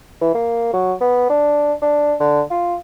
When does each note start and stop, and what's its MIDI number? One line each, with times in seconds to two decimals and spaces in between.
0.21 0.34 52
0.34 0.72 58
0.73 0.94 54
1.01 1.29 59
1.29 1.73 62
1.82 2.14 62
2.20 2.42 50
2.50 2.75 65